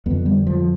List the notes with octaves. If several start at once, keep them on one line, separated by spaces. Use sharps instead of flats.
F2 D3 B3
G3
F3